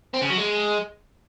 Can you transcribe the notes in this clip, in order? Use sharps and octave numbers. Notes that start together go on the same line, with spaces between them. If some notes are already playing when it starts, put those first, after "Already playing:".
C4
C#3
F#3
G#3